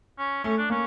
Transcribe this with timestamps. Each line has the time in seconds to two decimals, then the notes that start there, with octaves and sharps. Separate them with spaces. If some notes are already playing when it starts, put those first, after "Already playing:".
0.19 C#4
0.44 A3 C#4
0.58 D4
0.70 A#3 C#4